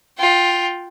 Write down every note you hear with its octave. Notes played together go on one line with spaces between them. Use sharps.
F4 G5